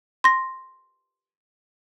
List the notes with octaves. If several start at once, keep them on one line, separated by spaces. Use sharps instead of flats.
C6 A#6